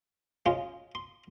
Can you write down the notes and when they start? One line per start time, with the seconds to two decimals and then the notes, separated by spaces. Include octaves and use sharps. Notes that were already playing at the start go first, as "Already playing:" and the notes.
0.46 C#3 G#3 C#4 F4 C6
0.95 C6